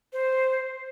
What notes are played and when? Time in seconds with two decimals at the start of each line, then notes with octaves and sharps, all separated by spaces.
0.13 C5